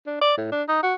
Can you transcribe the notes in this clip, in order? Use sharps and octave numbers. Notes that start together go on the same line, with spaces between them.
D4
D5
A2
D4
D#4
F#4